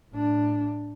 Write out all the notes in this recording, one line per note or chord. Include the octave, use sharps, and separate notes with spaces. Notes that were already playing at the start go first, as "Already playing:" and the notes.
A2 D4